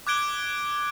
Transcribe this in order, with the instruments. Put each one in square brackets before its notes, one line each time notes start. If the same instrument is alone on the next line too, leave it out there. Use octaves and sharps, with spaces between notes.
[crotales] D6 F#6 G#6 D7 G7